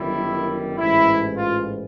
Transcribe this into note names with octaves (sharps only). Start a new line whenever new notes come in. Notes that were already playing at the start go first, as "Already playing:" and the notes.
Already playing: G1 F#2 D#3 G3 E4
A1 G#2 E3 E4
F4